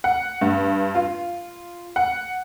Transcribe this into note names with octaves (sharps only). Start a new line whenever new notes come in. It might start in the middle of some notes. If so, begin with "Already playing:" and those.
F#5
G2
F4
F#5